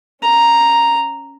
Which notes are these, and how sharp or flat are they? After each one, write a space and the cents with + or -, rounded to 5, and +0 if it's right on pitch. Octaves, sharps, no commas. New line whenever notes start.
C#4 +0 A#5 +0